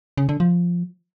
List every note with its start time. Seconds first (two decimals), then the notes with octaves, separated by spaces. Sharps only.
0.17 C#3
0.29 D3
0.40 F3